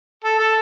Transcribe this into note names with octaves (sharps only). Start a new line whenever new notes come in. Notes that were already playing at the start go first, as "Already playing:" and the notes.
A4
A4